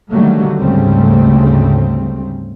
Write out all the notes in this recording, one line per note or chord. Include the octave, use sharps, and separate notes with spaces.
D3 D#3 F#3 G3 A3 A#3
D2 G#2 C#3 G3 A3 C4